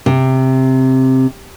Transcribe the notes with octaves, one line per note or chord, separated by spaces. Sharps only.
C3